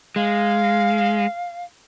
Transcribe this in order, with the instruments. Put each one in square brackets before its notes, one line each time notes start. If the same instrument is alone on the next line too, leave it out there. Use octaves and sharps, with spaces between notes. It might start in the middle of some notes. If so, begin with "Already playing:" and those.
[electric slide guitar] G#3 [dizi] F5